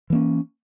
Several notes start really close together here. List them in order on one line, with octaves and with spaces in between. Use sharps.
E3 A#3 C#4